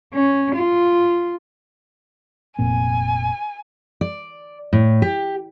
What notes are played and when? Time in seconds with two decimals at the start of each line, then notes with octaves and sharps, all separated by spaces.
0.14 C#4
0.55 F4
2.59 F1 A#2 C4 G#5
4.01 D5
4.73 A2
5.02 G4